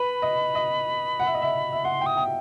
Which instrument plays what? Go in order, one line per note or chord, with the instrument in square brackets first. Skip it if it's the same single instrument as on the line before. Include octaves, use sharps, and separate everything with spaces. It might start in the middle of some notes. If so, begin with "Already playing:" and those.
Already playing: [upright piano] B4 [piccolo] B5
[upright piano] D#5
D#5
F#5
E5
D#5
E5
E5
[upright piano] F#5 [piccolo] C6
[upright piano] G5
[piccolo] D#6
[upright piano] G5